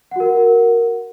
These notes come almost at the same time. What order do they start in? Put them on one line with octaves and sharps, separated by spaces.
F#5 F#4 A#4